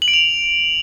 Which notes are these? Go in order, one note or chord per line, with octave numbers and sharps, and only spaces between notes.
F#7
D7
F7